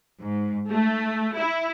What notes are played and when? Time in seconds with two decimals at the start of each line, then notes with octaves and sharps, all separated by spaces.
0.20 G#2
0.71 A3
1.38 E4